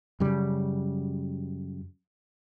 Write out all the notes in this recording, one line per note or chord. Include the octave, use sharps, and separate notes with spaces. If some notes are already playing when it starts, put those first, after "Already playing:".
F#2 C#3 G3